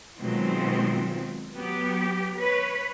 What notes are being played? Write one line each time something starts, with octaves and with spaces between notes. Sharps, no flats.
B2 D#3 F3 F#3 G#3 C4
F#3 B3 G4
B4 C#5